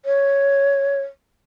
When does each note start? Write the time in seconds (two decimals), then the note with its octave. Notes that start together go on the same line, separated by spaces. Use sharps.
0.05 C#5